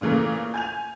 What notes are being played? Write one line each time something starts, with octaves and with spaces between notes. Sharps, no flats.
A#2 C#3 E3 A3 A#3
G#5 G6 F7